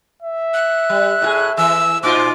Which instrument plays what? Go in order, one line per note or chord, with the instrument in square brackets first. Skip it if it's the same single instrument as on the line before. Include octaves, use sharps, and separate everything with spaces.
[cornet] E5
[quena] F#6
[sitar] G3
A2 F#4 G#4
[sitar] E3 [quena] E6
[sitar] A#2 D#4 F4 [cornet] C5 [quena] D6